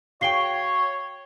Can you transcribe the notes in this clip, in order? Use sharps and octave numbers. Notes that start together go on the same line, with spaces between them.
F#4 G#4 C#5 F5 G5 C7 G7